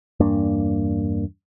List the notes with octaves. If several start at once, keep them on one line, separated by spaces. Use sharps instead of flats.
E2 G2 A#3 D4